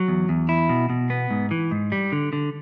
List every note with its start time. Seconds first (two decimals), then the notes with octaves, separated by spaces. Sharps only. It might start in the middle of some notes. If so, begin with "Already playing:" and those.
Already playing: F#3
0.08 E2
0.29 E2
0.49 E4
0.69 B2
0.90 B2
1.10 B3
1.30 G#2
1.51 E3
1.71 G#2
1.92 G3
2.12 D3
2.33 D3